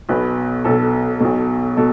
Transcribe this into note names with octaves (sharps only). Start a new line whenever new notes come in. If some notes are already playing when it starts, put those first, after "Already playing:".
B1 B2 B4
B1 B2 A4
B1 B2
B2 A4